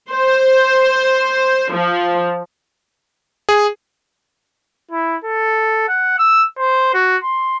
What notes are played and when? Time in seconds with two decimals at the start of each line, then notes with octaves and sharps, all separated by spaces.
0.10 C5
1.72 F3
3.49 G#4
4.91 E4
5.24 A4
5.88 F#5
6.18 E6
6.58 C5
6.94 F#4
7.23 C6